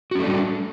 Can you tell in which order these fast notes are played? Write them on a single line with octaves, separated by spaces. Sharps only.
F#4 C#4 A3 D4 G3